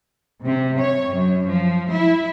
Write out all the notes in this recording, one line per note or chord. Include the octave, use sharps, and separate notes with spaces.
C3
C#5
F#2
F3
E4